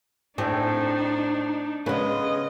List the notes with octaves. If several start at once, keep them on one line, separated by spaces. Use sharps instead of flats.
A2 C4 D4 D#4 G#4
C#3 G#3 B3 C#4 B4 D#5